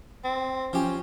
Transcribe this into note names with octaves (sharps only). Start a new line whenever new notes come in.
C4
F3 C#4 G4